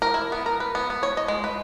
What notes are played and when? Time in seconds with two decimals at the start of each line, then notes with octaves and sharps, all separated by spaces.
0.02 A#4
0.14 E4
0.32 B3
0.46 A#4
0.60 B4
0.75 B3
0.90 B3
1.03 C#5
1.17 D#5
1.28 G#3
1.44 B4